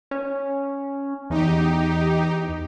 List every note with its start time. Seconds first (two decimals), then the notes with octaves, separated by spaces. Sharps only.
0.11 C#4
1.30 E2 D#4 G4